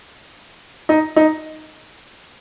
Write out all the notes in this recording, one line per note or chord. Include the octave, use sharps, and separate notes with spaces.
D#4
D#4